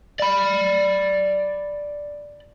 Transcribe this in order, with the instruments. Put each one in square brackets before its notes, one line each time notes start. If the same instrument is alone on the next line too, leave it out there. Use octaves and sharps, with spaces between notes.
[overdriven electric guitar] D5 B5